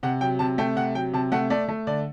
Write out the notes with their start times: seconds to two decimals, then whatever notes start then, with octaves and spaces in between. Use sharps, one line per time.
0.03 C3 F#5
0.21 F#3 G5
0.39 C3 A5
0.58 A3 G5
0.76 C3 F#5
0.95 F#3 G5
1.13 C3 A5
1.32 A3 F#5
1.50 A3 D5
1.69 A3
1.87 D3 D5